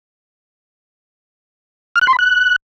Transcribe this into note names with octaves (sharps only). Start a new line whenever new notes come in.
F6
F#6
C6
B5
F#6